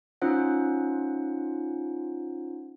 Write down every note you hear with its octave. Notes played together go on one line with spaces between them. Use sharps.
C#4 D#4 F4 C5 F#5